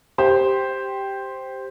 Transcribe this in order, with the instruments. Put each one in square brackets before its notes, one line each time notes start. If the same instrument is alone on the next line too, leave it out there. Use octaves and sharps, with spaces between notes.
[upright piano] G4 C5